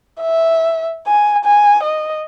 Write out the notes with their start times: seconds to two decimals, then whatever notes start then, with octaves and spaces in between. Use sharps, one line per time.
0.21 E5
1.07 G#5
1.45 G#5
1.83 D#5